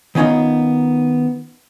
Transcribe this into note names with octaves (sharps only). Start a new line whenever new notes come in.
D#3 B3 C#4 D#4 F4